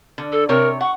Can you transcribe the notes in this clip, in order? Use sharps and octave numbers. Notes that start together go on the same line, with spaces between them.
D3
A4
C3 A#4 C#5
F#5 C#6